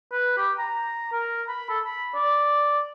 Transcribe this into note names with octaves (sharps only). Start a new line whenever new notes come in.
B4
G4
A#5
A#4
B5
A4
B5
D5